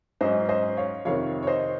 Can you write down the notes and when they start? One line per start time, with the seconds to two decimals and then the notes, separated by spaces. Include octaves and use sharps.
0.21 G#2 F#3 C#4 C5 D#5
0.49 C5 D#5
0.77 C#5 F5
1.05 F2 C3 D#3 C#5 F5
1.43 C#5
1.47 C5 D#5